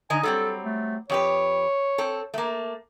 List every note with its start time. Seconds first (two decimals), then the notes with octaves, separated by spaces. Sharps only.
0.10 D3 D#4 D#5 G#5
0.23 F#3 G3 C4 A4
0.64 A3
1.10 F2 G4 B4 C#5
1.98 C4 A4
2.34 A3 A#3